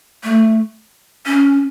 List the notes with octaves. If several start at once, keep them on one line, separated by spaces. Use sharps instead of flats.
A3
C#4